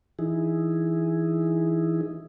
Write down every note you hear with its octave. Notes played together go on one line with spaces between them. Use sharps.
E3 D#4 E4 G#4